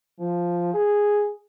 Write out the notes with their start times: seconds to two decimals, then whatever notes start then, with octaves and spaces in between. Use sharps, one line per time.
0.19 F3
0.74 G#4